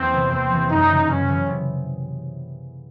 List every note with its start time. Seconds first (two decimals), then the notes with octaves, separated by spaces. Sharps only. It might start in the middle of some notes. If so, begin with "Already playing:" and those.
Already playing: E2 A#3 C4
0.13 C3 E3
0.30 E2 C4
0.50 C3 E3
0.69 F#2 D#4
0.89 C#3 E3
1.08 F#2 C#4
1.27 C#3 E3
1.47 C3